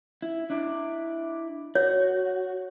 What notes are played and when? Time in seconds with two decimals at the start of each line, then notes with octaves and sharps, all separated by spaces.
0.22 E4
0.50 D4 E4 D5
1.75 F#4 C#5